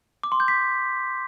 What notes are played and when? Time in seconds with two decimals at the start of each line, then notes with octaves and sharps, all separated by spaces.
0.23 D6
0.32 C6
0.40 G6
0.48 B6